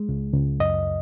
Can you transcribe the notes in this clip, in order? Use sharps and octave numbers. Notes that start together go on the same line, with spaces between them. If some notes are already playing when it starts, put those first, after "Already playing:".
Already playing: G#3
C#2
C#2
F#2 D#5